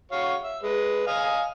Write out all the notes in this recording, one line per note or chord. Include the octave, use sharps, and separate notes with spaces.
F#4 C#5 F5
E5
G#3 B4
D#5 F5 G#5